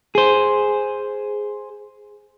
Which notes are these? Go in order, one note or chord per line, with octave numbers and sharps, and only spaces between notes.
G#4 C5